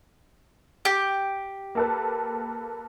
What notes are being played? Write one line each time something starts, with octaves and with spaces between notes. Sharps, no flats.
G4
A#3 A4 B4